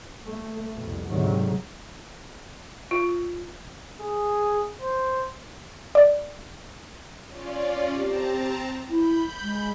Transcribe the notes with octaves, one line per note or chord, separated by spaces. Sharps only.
A3
C2 F2 B2
D2 G#2 C3 D#3 F#3
F4
G#4
C5
D5
C#4 F4 D5
C4 G4 A5 A#5
E4 B5 G6
G#3